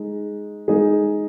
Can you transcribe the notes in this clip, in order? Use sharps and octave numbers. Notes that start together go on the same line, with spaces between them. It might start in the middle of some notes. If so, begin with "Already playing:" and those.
Already playing: G#3 D#4
G#3 D#4 G#4